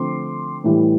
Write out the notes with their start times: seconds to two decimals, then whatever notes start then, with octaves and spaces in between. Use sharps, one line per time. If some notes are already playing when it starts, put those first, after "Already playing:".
Already playing: D3 F3 A3 C4 C6 D6
0.64 A2 E3 G3